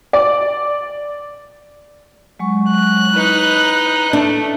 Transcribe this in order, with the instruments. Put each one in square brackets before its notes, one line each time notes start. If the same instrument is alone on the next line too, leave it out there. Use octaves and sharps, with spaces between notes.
[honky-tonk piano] D5
[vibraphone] F#3 G#3 C#6
[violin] F#6
[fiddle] D#4 B4 [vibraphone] E4
[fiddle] A3 [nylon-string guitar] D4